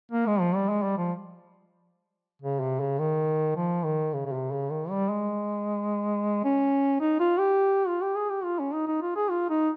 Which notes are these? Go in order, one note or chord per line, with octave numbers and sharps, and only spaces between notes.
A#3
G#3
F3
G3
G#3
G3
F3
C#3
C3
C#3
D#3
F3
D#3
C#3
C#3
C3
C#3
D#3
G3
G#3
C#4
D#4
F4
G4
F4
G4
G#4
G4
F4
C#4
D#4
D#4
F4
G#4
F4
D#4